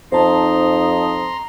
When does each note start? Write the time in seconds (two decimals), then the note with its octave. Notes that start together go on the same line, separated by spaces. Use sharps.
0.12 F2 D#4 C5 A5 A#5 C6